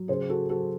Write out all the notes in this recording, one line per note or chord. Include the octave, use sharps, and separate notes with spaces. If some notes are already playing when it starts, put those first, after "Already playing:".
Already playing: F#3
C#3 G#4 C5
F#4 A4
F#3 F#4 A4